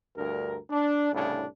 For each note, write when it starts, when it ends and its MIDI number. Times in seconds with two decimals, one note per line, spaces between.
0.16 0.57 38
0.16 0.57 43
0.16 0.57 70
0.70 1.13 62
1.13 1.45 36
1.13 1.45 45
1.13 1.45 49
1.13 1.45 62